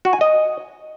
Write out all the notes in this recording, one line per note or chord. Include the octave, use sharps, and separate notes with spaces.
F#4
G#5
D#5